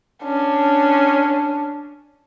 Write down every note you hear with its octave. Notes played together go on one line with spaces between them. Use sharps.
C#4 D4